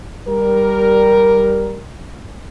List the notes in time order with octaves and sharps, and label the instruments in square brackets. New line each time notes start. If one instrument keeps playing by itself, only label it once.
[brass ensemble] G3 A#4